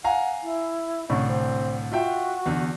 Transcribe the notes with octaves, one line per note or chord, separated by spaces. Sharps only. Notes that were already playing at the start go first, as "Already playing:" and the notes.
F5 F#5 G#5 A#5
E4
C2 A2 D3 C#4
C4
F4 F#4 E5 G5
E2 D3